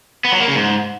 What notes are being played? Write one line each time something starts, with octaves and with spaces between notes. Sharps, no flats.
B3
F#3
A#3
C#3
G#2